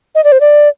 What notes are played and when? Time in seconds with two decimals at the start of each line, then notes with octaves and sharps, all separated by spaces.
0.15 D#5
0.24 D5
0.32 C5
0.41 D5